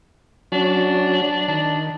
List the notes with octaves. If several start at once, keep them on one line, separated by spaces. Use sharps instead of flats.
F#3 C#4 D4
D#3 D4